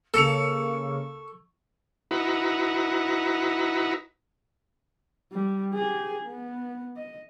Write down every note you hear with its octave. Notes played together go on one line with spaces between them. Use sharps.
C#3 A#3 A4 C#6 E6 C#7 F7
D#4 E4 F#4 B4 A#5
G3
G4 G#4
B3
D#5